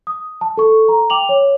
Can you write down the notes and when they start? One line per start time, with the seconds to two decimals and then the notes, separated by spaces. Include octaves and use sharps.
0.07 D#6
0.41 A5
0.57 A4 C#6
0.88 A#5
1.10 G5 D6 F7 F#7
1.29 C#5